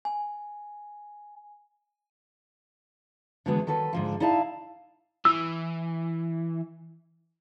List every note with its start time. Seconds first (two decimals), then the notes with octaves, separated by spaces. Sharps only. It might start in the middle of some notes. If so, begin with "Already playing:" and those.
0.05 G#5
3.46 D3 E3 F#3 G#3 B3
3.67 D#3 F#3 A4 B4
3.93 G#2 D3 F3
4.20 D#4 E4 D5 F5 A5
5.25 E3 E6